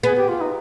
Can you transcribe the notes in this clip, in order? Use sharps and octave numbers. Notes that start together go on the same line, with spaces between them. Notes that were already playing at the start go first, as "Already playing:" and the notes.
B3 G#4
G4
F4
D#4